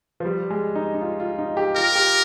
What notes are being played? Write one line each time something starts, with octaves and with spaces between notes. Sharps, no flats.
F3
G3
G#3
D#4
D#4
F4
F4
D#4
G4
F4 A#4
G4